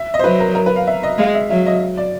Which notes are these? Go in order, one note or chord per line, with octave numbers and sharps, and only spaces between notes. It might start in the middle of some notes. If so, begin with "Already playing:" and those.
Already playing: E5
D#5
C5
F#3 B4
A#4
A#4
B4
F5
E5
D#5
G#3 F5
E5
F#3 E5
D#5
D5